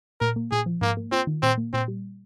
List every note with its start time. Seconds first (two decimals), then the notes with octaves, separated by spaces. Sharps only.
0.21 A#2 A#4
0.36 A#3
0.51 A#2 G#4
0.66 F3
0.81 G#2 A#3
0.97 A#3
1.12 C4 F4
1.27 D#3
1.43 A#2 C4
1.58 A#3
1.73 A#2 C4
1.88 G3